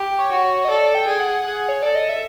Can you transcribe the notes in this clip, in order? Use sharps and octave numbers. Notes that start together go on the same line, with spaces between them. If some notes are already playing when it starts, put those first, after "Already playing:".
Already playing: G4
C#5
F#4
C#5
D#5
A4 D5
G5
G#4
G5
F#5
G#4
C#5
A4 D5
D#5
E5